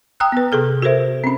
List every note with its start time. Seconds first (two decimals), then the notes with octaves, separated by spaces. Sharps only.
0.20 G5 A#5 D#6 E6 F#6
0.32 B3 B4
0.52 C3 G#4 A4 F6
0.82 F#4 A4 A#4 C5 E5
1.24 C4 C#4